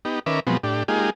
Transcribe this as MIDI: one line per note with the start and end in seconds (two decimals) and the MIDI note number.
0.05 0.19 59
0.05 0.19 63
0.05 0.19 67
0.26 0.40 51
0.26 0.40 61
0.26 0.40 70
0.26 0.40 71
0.26 0.40 76
0.26 0.40 86
0.47 0.57 47
0.47 0.57 53
0.47 0.57 54
0.47 0.57 56
0.47 0.57 59
0.47 0.57 60
0.64 0.83 45
0.64 0.83 62
0.64 0.83 67
0.88 1.10 56
0.88 1.10 58
0.88 1.10 63
0.88 1.10 65
0.88 1.10 67
0.88 1.10 68